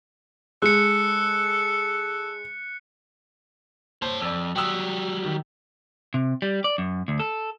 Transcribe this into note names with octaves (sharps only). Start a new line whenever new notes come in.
G#3 A4 F#6 C#7
C5 C#5 A5
F2 D5 E6
F#3 G3 G5 D#6 E6
D#3
C3
G3
D5
F#2
D2
A4